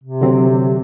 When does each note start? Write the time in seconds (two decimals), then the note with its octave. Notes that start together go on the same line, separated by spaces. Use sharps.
0.03 C3
0.21 D3 F#3 C4